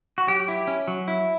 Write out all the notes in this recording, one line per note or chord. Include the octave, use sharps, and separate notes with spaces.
F#4
F#3 G4
E4
C#4
F#3
E4